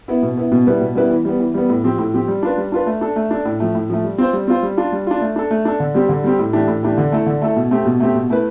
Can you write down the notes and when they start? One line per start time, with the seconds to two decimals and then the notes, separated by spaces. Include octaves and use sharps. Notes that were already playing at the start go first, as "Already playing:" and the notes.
0.08 B3 E4
0.23 B2
0.37 B3 E4
0.52 B2
0.67 G3 B3 E4 B4
0.81 B2
0.95 G3 B3 E4 B4
1.10 E3
1.25 G3 B3
1.40 E3
1.54 G3 B3
1.70 A2
1.84 F3 C4 G4
1.98 A2
2.14 F3 C4 G4
2.28 G3
2.43 D4 F4 B4
2.58 G3
2.72 D4 F4 B4
2.86 A3
3.01 D4 A4
3.16 A3
3.31 D4 A4
3.45 A2
3.60 F3 A3
3.75 A2
3.90 F3 A3
4.04 G3
4.18 C4 F4 C5
4.33 G3
4.48 C4 F4 C5
4.63 G3
4.78 D4 F4
4.92 G3
5.07 D4 F4
5.21 A3
5.36 D4 A4
5.51 A3
5.65 D4 A4
5.80 D3
5.95 G3 C4 G4
6.09 D3
6.24 G3 C4 G4
6.39 A2
6.53 E3 A3 D4 G4
6.68 A2
6.83 E3 A3 D4 G4
6.98 D3
7.12 A3 E4 A4
7.27 D3
7.42 A3 E4 A4
7.56 B2
7.71 A3 C4 G4
7.86 B2
8.00 A3 C4 G4
8.14 B2
8.30 A3 E4 B4